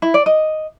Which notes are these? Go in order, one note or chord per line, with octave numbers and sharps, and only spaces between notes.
E4
D5
D#5